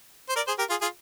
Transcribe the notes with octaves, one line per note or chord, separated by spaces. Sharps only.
C5
A#4 D5
G#4 C5
G4 A#4
F4 G#4
F4 G#4